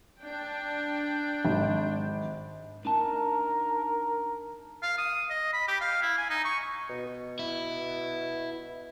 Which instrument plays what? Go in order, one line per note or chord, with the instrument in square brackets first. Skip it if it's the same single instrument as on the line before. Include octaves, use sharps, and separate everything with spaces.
[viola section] D4 G5
[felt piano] G#1
[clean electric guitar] D4 D#4 A5 [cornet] A#4
[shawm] F5
D#6
D#5
B5
G4
F5
E4
G#5
D#4
C#6
[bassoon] B2
[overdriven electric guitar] E4